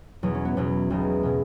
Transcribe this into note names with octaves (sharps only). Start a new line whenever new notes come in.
E2 B2 F#3 B3
C#4
B3
E2 B2 F#3 B3
B1 B2 G#3
B2 G#3